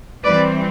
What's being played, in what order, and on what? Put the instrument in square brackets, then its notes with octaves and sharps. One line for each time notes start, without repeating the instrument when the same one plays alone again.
[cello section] E3 G3 C4 B4 D5